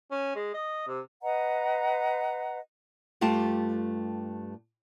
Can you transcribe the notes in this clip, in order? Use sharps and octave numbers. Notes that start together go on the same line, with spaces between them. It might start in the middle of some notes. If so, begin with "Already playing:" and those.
C#4
G#3
D#5
C3
B4 D#5 F#5 A#5
G2 A3 F4 G4 A5